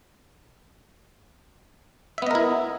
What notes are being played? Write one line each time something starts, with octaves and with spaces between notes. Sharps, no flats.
B3 E4 A#4 D#5 E5